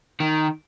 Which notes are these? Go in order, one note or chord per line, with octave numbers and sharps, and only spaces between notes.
D#3